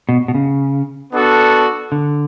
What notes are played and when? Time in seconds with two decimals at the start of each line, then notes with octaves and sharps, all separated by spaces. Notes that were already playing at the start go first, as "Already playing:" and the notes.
0.09 B2
0.28 B2
0.35 C#3
1.13 B3 D4 F#4 A4
1.92 D3